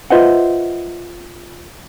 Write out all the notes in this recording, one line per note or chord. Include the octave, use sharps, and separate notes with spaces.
F4 B4 C5 D#5 E5 F#5